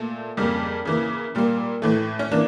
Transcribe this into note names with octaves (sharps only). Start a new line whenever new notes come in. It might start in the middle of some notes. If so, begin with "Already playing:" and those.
Already playing: A#2 A3 A4
F2 C#3 G3 A#3
C#3 E3 A#3
A#2 G3 A#3
A2 E3 A3
C#4
E3 A#3 D4